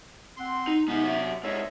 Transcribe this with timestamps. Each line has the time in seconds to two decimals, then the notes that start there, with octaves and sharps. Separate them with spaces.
0.37 C4 F#5 C6
0.67 D#4
0.88 C3 G#3 B3 D#4
1.04 F#3 E5
1.43 A#2 G#3 C#5 D#5 E5